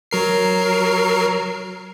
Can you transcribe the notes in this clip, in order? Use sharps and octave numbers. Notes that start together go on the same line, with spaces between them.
F#3 A#4 C7